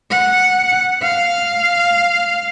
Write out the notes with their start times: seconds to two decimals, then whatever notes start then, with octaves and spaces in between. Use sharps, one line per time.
0.11 F#5
1.02 F5